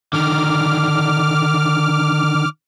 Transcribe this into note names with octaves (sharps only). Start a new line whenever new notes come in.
D3 D#3 D6 F6